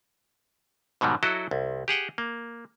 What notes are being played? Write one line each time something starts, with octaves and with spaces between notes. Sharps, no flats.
G#2 B2 D#3 F#3 G3
F#3 E4 F#4 A4 D#5
C2
G4 G#4 F#5 G5
A#3